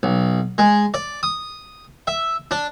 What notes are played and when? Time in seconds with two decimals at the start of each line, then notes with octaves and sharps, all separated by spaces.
0.03 B1
0.58 G#3
0.94 D5
1.23 D#6
2.07 E5
2.51 D4